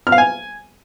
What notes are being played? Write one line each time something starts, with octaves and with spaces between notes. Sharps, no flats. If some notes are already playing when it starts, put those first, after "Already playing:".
F6
F5
G#5